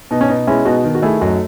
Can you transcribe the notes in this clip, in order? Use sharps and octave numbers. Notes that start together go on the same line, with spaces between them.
B2 D#4
C#4
B2 D#4
G#3 C#4 E4
B2 D#4 F#4
D#3
F#4
A3 E4 G#4
F#2 D#4 F#4